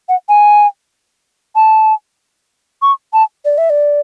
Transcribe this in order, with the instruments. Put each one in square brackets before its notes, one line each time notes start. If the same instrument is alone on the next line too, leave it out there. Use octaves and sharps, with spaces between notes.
[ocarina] F#5
G#5
A5
C#6
A5
D5
E5
D5